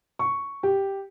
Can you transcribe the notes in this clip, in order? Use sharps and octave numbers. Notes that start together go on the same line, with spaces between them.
C#6
G4